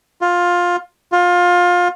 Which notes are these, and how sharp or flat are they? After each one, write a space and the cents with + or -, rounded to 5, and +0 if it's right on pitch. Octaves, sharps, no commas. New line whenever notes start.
F4 +15
F4 +25